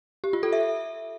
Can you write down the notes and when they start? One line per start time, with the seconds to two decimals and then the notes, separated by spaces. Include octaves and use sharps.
0.24 G4
0.33 F4
0.43 A4
0.53 E5